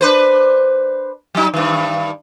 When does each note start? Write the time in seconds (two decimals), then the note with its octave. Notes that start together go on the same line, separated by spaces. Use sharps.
0.01 D4 B4 C5
1.35 F#3 D#4
1.54 G2 D#3